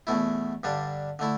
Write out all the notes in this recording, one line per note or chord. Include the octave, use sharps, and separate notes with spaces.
E2 B2 A3 E4
G2 D3 G3 D4
D3 A3 E4